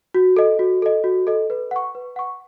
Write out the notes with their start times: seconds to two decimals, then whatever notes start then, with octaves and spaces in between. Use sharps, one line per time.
0.14 F#4
0.37 A4 D#5
0.59 F#4
0.82 A4 D#5
1.04 F#4
1.27 A4 D#5
1.50 B4
1.71 F#5 C#6
1.95 B4
2.16 F#5 C#6